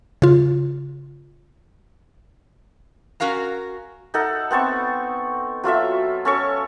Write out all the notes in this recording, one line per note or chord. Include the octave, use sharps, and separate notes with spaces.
C#3 F4
C#4 F#4 A#4 F5 A#5
D#4 A4 F#5
B3 C4 A5 C#6
F#3 F4 A4 E5
C#4 A4 C#5 C#6